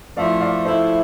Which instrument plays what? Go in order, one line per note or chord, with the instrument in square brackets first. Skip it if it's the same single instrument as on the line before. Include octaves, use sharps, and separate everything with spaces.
[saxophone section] F3 A3 E4 [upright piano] D5 F5
[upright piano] D5 F5
[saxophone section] F3 A3 E4 [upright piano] C5 E5